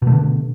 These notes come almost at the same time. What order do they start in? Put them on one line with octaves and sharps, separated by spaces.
B2 A3 D3